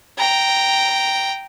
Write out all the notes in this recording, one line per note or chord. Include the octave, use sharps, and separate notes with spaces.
G5 A#5